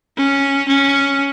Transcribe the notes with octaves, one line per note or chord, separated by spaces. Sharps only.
C#4
C#4